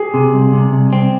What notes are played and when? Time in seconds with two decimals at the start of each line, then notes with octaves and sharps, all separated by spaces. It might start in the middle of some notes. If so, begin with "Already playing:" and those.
Already playing: G4 G#4
0.14 C3
0.34 C2
0.53 C3
0.73 C2
0.93 C4